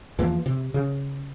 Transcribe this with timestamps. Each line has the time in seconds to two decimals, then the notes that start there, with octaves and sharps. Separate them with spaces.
0.18 E2 E3 F3 A#3
0.46 C3
0.74 C#3